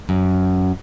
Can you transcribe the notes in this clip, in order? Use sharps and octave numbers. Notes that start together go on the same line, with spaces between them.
F#2